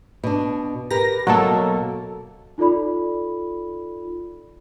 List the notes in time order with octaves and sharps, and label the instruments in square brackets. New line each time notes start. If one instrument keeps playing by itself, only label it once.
[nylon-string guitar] B2 D4
[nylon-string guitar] G4 A#4 B4 [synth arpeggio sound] A#6
[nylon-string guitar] B2 A#3 E5 [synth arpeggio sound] F#3 A4
[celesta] D#4 F4 A4 D5 B5